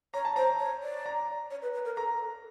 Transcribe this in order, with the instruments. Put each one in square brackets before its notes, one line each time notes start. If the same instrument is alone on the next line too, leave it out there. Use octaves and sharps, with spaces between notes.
[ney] C#5 [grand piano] A#5
[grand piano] A5
[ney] C5 [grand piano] A#5
[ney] C#5
D5
[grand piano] A#5
[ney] C#5
B4
B4
A#4
[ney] A4 [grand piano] A#5